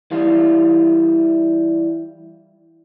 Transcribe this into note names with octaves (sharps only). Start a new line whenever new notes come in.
E3 G3 F4